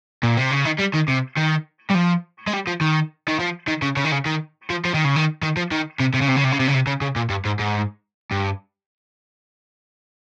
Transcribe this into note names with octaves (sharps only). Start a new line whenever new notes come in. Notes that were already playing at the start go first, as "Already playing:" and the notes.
A#2
C3
C#3
D#3
G3
D#3
C3
D#3
G3
F3
G#3
G3
F3
D#3
D#3
F3
D#3
C#3
C#3
D#3
C#3
D#3
F3
F3
D#3
C#3
D#3
D#3
F3
D#3
C3
C3
C#3
C3
C#3
C3
C#3
C3
C#3
C3
C#3
C#3
A#2
G2
G#2
G#2
G2